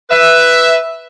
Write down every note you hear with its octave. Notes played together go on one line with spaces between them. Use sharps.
B4 E5